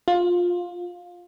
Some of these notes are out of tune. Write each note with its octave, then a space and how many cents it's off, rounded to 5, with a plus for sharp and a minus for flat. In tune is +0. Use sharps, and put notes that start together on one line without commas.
F4 +15